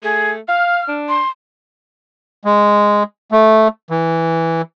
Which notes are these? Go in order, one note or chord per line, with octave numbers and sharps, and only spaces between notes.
A3 G#4
F5 F6
D4
C6
G#3
A3
E3